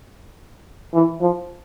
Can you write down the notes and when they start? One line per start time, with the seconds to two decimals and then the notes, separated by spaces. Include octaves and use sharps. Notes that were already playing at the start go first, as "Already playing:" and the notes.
0.94 E3
1.21 F3